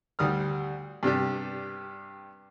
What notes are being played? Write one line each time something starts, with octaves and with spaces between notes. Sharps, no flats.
D2 G3 D#6 F6
G2 C3 D4 G4